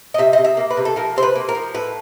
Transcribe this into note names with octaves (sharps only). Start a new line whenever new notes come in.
D#5
C3 E5
C3 D#5
E5
A#3
B4
C3
A4
F3 A#4
C3 C5
B4
A#3
A#4
F3
A2 B4